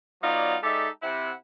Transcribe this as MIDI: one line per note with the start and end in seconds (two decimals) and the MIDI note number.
0.23 0.55 54
0.23 0.55 59
0.23 0.55 63
0.23 0.55 65
0.23 0.55 74
0.62 0.87 56
0.62 0.87 63
0.62 0.87 67
0.62 0.87 69
0.62 0.87 74
0.62 0.87 76
1.02 1.32 48
1.02 1.32 64
1.02 1.32 78